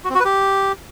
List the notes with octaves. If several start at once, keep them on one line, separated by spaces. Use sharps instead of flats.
F#4
C4
F#4
B4
G4